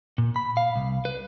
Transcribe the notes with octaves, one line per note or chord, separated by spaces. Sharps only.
A#2
B5
F5
C2
B4